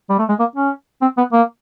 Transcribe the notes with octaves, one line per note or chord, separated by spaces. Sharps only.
G3
A3
G#3
A#3
C#4
C4
B3
A#3